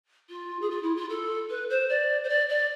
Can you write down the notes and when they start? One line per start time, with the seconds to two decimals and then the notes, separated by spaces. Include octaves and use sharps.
0.30 F4
0.61 G#4
0.70 F4
0.83 E4
0.96 F4
1.09 A4
1.50 B4
1.70 C5
1.89 D5
2.24 C5
2.29 D5
2.49 D5